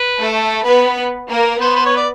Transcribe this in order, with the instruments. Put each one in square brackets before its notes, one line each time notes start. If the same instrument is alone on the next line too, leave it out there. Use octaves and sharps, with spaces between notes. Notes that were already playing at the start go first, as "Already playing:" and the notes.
Already playing: [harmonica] B4
[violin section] A3 A4
B3 B4
A#3 A#4
[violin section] B3 B4 [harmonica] C5
[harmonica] C5
C#5
D5